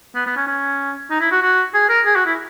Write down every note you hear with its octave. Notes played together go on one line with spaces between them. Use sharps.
B3
B3
C#4
C#4
D#4
E4
F#4
F#4
G#4
A#4
G#4
F#4
E4